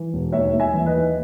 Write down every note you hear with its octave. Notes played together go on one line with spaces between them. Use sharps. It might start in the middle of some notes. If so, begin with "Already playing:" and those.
Already playing: E3
E1
D#2 C#5 E5
D#2
E5 G#5
E3
B4 D#5
D#2